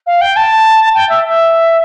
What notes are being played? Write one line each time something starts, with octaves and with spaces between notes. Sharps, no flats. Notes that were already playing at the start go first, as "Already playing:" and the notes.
F5
G5
A5
G5
E5
E5